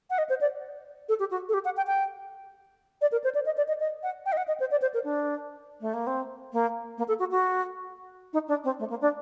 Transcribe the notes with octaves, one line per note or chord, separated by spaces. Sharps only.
F#5
D#5
C5
D5
A4
G4
F#4
A4
G4
F#5
G5
G5
D5
A#4
C5
D5
D#5
D5
D#5
D#5
F#5
G5
D#5
F#5
D#5
C5
D5
C5
A#4
D4
A3
A#3
C4
A#3
A#3
A4
F#4
F#4
D#4
D4
C4
A3
A#3
D4